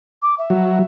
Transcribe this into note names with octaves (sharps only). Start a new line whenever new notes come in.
D6
E5
F#3